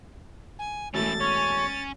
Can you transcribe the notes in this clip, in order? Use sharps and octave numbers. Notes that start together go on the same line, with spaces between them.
G#5
E1 A3 C#4 E4 A6
C#4 C#5